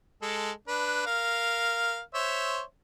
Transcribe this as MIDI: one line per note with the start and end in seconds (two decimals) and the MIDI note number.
0.22 0.51 56
0.22 0.51 69
0.68 1.03 62
0.68 1.03 71
1.06 2.00 70
1.06 2.00 77
2.14 2.62 72
2.14 2.62 73
2.14 2.62 76